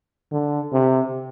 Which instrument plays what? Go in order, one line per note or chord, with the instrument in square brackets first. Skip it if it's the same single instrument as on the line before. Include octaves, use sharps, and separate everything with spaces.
[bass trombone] D3
C3